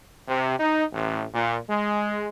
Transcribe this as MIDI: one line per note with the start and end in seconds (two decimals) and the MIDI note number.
0.28 0.55 48
0.58 0.83 63
0.92 1.23 33
1.33 1.57 46
1.69 2.29 56